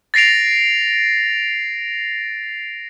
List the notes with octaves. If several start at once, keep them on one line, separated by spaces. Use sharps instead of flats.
A6 A#6 C7 D7 F7